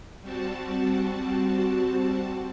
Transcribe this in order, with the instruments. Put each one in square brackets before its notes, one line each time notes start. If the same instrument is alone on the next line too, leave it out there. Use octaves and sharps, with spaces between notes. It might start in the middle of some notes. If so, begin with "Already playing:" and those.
[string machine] G3 C4 F#4 A5